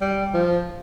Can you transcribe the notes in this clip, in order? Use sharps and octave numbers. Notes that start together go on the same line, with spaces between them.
G3
F3